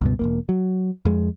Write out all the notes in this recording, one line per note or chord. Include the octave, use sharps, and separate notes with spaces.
C#2 G2 B2
E1 E2 A#3
F#3
F2 G#3